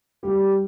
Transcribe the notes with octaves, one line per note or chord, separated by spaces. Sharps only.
G3 G4